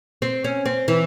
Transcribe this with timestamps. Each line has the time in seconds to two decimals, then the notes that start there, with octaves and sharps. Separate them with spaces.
0.22 C4
0.44 C#4
0.66 C4
0.88 E3